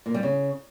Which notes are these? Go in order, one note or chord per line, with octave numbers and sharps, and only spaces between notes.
A#2
G3
C#3